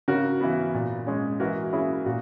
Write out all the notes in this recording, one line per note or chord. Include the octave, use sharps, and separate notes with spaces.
C#3 F#4 A#4
E3 B3
A#2
G#3 C#4
E3 F#4 A#4
A#3 C#4 E4 G#4
A#2 F#4